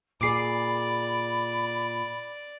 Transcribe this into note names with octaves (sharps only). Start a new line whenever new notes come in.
A#2 G#4 D5 B5 D6 C7